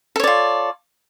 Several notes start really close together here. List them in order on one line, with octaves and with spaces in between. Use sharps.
A4 C#5 D5 F4